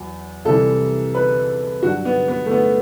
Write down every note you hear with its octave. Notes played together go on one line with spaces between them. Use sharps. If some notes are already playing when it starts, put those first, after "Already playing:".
Already playing: E2 F#3
C2 C3 E3 A4
B4
G2 F#3 F#4
B3
B3
A3
B3